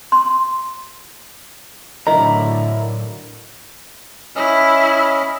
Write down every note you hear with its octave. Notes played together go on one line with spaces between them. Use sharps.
C6
A2 D3 F#3 E4 A#4 D#5 A#5
C#4 E4 D#5 F6